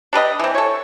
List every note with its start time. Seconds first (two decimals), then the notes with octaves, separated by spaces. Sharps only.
0.13 D4 G4 B4 D#5
0.39 E3 C4
0.55 A4 C#5